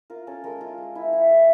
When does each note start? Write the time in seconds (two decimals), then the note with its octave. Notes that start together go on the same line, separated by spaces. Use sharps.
0.10 F4 A#4
0.27 C#4 A4
0.44 G#3 A#4
0.61 F4
0.78 G#3
0.95 E4
1.13 E4
1.30 G#3